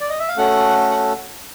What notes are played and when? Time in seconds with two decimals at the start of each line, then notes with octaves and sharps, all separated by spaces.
0.01 D5
0.09 D#5
0.19 E5
0.28 F5
0.37 A3 C#4 F#4 A4 F#5
0.91 F#5